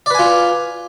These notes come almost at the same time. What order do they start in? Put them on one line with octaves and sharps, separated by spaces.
D5 B4 G#5 F4